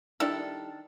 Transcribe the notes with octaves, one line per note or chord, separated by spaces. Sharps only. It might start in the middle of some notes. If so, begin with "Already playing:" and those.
D#3 G3 D4 E4 A4